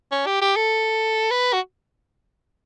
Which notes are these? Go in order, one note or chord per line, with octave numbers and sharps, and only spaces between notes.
C#4
G4
G4
A4
B4
F#4